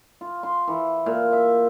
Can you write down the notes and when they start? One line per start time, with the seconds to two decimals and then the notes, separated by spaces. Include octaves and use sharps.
0.21 F4
0.43 C6
0.68 E3
1.06 A#2
1.33 E5